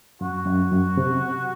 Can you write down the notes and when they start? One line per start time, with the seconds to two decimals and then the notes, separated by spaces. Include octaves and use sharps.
0.21 F#2 F#4
0.46 F#2
0.71 F#2
0.97 C3